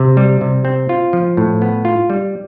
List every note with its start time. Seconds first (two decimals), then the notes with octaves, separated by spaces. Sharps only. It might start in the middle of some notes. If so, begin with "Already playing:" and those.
Already playing: C3
0.17 G3
0.41 C3
0.65 C4
0.89 F4
1.13 F3
1.37 A2
1.62 B3
1.85 F4
2.10 G3